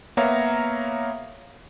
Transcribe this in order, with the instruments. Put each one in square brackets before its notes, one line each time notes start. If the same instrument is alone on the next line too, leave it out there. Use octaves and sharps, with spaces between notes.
[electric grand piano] A#3 B3 C#5 E5 F5 A#5